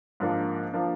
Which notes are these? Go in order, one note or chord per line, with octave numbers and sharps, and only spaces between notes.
G#2 F3 A#3 D4
F3 A#3 D4